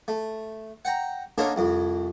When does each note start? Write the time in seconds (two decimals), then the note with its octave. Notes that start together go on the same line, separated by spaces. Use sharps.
0.08 A3
0.85 F#5 G5 A#5
1.38 D3 A#3 C#4 D#4 A4 A#4
1.56 C2 F2